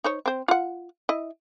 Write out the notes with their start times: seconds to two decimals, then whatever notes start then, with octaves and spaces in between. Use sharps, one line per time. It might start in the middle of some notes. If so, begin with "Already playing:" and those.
0.04 D#4 C5 C#5
0.26 C4 C5
0.48 F4 F#5
1.09 E4 D#5